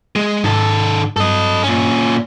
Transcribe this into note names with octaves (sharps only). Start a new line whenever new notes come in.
G#3
G#2 D#3 A4
G2 A4 D#5
A#2 C#4